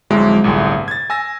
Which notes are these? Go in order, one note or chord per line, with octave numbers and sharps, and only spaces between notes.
G1 F2 F#3 G#3 E4
G1 C2 A2 G#4
G#6 A6
G#5 E6 A#6